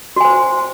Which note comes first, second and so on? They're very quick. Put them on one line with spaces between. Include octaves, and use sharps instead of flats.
F#4 G#5 C5